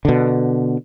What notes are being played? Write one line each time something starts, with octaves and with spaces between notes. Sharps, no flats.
B2 D3